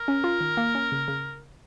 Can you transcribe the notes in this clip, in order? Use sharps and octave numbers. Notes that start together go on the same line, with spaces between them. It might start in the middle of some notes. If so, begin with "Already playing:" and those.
Already playing: A#4
C#4
F4
D#3
A#3
C#4
C#3
C#3